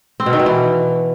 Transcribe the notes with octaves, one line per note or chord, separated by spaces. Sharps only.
C4
B2
D#3
B2
E3